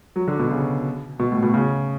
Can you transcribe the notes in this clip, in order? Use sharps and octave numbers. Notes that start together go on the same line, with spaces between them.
F#3
D3
B2
C#3
B2
A2
B2
C#3